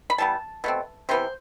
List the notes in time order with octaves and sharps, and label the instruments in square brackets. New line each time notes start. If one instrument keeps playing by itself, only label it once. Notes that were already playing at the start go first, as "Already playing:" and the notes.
[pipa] B5
E3 G3 B3 A5
B2 A3 C4
C3 E3 B3 C5